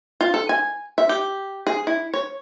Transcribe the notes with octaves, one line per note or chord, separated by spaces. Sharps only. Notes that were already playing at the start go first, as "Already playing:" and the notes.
F4
A4
G#5
E5
G4
G#4
E4
C#5